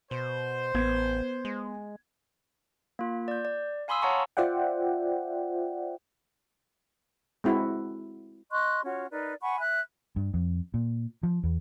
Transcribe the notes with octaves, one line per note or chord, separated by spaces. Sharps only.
B2 C5
A1 B3 G#6
G#3
A#3 F4
D5 G6
D5
F5 G#5 B5 C6 D#6 E6
C#5 F5 F#5 A5 A#5 C#6
F4 C5 D5 E5 F#5 G5
G#3 C4 E4 F#4
D#5 C6 C#6 F#6
C#4 F4 F#4 C#5
D#4 A#4 B4 D5
F#5 G#5 B5 C#6
E5 F#6
G2
F2
A#2
F3
E2